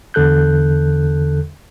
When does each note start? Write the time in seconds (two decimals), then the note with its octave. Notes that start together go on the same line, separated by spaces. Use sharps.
0.14 E2 D3 A4 F#6 G6